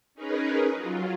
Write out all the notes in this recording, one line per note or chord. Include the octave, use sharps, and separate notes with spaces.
C#4 D#4 G#4 A#4 B4
F#3 F4